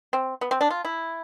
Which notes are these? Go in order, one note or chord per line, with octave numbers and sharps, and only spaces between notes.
C4
B3
C4
D4
F4
E4